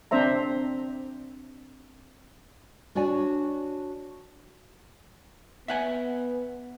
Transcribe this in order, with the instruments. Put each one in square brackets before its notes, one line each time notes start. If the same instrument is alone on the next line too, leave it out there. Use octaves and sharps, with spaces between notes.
[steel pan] C4 D4 C5 E5 A#5
[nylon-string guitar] D4 F#4 C#5 D5 G#5
[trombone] B3 [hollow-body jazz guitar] E5 F#5 G#5